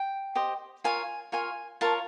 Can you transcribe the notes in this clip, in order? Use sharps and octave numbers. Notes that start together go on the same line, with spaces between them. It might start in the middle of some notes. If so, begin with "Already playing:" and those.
Already playing: G5
G4 C5 D#5
F4 A#4 C#5 G#5
F4 A#4 C#5 G#5
F4 A#4 C#5 A5